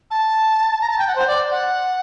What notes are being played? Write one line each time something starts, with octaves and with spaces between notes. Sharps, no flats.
A5
A#5
A5
G5
F#5
C5
D5
F#5